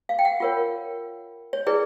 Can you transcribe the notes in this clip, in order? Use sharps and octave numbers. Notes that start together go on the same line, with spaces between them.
F5
G5
F#5
F4 A#4 C#5
C#5
E4 G#4 B4 D5